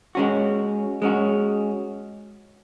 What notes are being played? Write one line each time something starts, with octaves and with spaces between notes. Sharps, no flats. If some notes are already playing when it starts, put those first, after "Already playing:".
G#3 C#4 F#4
G#3 C#4 F#4